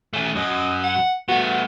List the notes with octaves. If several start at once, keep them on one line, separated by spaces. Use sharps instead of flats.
A3 C#4
F#2 F#3 D#5
F#5
A3 B3 F#4